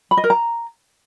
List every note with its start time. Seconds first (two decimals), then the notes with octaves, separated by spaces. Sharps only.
0.11 B5
0.17 D#5
0.24 A#4
0.30 A#5